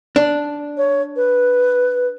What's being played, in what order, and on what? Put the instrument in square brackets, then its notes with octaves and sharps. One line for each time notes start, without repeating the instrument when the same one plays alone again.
[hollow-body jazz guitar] D4
[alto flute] C#5
B4